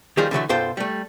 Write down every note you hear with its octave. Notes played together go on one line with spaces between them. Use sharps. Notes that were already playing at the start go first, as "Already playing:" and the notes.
D#3 F3 G3 D#4 F4 G#4
D3 E3 F#3 A3
B1 F#2 F4 A4 C5 G5
G3 A3